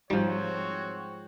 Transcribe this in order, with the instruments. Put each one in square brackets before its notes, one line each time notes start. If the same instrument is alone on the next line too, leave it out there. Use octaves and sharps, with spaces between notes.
[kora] G#2 F3 [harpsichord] G3 [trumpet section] C4 F#4 C#5